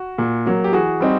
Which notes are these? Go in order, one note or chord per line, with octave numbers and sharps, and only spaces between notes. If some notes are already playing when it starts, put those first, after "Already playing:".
Already playing: F#4
A#2
F#3 A#3
G4
E3 F#4 G#4
G3 C4 D#4